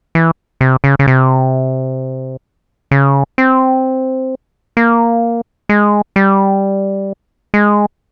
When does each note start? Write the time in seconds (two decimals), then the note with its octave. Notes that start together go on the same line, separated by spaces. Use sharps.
0.15 E3
0.61 C3
0.84 C#3
0.99 C#3
1.07 C3
2.91 C#3
3.38 C4
4.77 A#3
5.69 G#3
6.16 G3
7.54 G#3